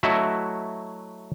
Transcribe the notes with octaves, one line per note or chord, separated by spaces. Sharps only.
F#3 A3 E4 F#4 D#5 E5